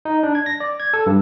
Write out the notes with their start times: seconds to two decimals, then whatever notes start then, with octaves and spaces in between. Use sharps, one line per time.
0.05 D#4
0.23 D4
0.35 G#6
0.46 A#6
0.60 D5
0.80 G#6
0.94 A4
1.06 G2